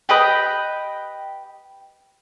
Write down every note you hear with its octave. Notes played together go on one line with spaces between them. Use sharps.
G4 B4 D#5 G5